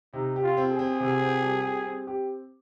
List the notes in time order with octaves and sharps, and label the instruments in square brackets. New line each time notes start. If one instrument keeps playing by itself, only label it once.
[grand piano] C3 [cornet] D#4
[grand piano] G4
[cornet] F4
[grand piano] C4
[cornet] G#4
[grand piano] C4
C3
C4
G3
G4
C4
G4